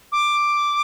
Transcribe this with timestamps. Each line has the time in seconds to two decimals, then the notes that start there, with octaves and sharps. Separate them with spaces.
0.12 D6